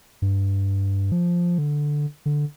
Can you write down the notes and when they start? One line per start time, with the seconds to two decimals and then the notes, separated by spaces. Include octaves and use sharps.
0.22 G2
1.12 F3
1.58 D3
2.26 D3